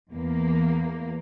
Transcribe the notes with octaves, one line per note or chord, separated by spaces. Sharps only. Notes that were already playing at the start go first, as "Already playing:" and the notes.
E2 A#3